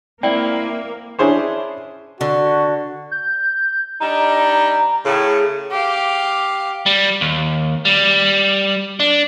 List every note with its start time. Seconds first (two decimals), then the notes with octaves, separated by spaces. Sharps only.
0.23 A#3 C4 E4 D5 F#5 G5
1.19 C#4 D4 E4 G#4 C5 C#5
2.21 D3 F#4
3.11 G6
4.00 G3 D4 D#4 A#5
5.05 A2 C#3 G#4
5.71 G4 F5
6.86 G3
7.21 D#2
7.85 G3
9.00 D4